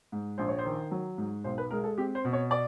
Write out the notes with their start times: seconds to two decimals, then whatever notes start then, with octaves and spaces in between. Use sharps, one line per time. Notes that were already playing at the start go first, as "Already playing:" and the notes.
0.12 G#2
0.38 A#1 C5
0.48 C#5
0.59 C5
0.65 D#3
0.91 F#3
1.18 G#2
1.44 B1 C5
1.58 B4
1.71 G#3 A#4
1.84 A4
1.98 C4 G4
2.15 C5
2.25 B2
2.33 C#5
2.51 D5